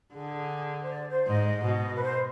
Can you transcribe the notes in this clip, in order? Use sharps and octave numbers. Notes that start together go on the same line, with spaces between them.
D3 G#4
C5
D5
C5
G#2 D#5
B2
B4
C5